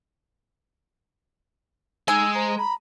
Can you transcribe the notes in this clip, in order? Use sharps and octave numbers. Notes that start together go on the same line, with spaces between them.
G#3 D#4 G#5 E6
C5 A#5
A#5 B5